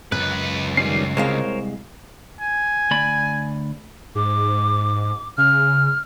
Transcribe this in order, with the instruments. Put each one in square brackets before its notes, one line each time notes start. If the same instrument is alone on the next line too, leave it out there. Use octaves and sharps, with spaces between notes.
[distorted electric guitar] C#2 B4 [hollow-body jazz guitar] F#2 [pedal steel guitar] F#6
[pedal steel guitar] D#3 G3 C#4 [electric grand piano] C7
[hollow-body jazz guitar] C2 G#3 F5 [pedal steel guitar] A#4 C5 C#5
[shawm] G#5
[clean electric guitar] D2 D5 B5
[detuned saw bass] G#2 [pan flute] D6
[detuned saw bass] C#3 [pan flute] F6